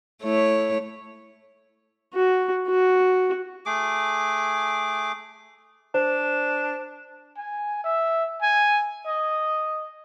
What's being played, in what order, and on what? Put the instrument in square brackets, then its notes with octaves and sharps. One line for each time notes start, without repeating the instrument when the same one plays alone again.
[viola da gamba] A3 E4 C#5
[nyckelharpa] F#4
F#4
[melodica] A3 G#4 D6
[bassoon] D4 [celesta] C5
[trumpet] G#5
E5
G#5
D#5